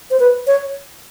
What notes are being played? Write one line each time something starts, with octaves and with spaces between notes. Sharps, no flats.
C5
B4
C#5